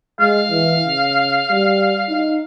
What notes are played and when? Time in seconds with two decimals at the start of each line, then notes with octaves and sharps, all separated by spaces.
0.20 G#3 F5
0.51 E3
0.83 C#3
1.50 G3
2.09 D#4